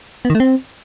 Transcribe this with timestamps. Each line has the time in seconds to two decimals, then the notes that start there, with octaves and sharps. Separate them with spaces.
0.25 B3
0.30 D#3
0.35 A3
0.40 C4